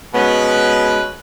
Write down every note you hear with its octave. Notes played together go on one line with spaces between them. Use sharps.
B2 G#3 B3 C#4 B4